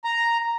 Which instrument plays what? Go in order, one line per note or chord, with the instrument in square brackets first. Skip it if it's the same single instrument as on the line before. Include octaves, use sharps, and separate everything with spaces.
[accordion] A#5